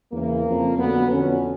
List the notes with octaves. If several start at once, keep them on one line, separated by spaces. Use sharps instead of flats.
E2 C#3 E3 A#3
F2 C#3 F3
F2 D3 F#3 B3
F2 D3 F#3 C#4